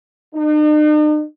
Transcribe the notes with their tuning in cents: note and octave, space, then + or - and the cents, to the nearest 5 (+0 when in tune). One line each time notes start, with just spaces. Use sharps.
D#4 -45